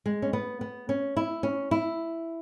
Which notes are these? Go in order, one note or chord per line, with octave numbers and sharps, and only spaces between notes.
G#3
C#4
B3
B3
C#4
E4
C#4
E4